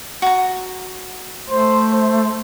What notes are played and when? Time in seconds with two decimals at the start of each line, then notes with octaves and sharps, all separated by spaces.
0.22 F#4 A#5
1.50 A3 C5
1.93 C5